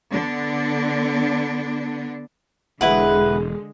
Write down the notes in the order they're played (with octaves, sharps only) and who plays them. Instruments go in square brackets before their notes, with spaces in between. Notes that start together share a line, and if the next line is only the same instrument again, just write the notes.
[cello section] D3 B3 D4
[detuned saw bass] E1 [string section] D3 G#3 [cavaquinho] E4 B4 F#5